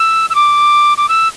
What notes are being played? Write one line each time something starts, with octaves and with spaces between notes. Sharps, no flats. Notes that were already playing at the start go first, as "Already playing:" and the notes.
Already playing: E6
E6
D6
D6
E6